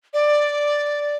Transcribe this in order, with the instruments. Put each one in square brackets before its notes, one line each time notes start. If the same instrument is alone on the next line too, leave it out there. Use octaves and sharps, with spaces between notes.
[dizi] D5